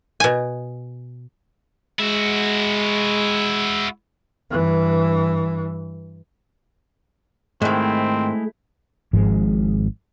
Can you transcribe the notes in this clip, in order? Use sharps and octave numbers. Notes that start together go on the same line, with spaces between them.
B2 G#5
G#3 E4 F#4
G2 E3
G#2 D#3 G#3 A3 C4 E4
G#1 G#2 F3 G#3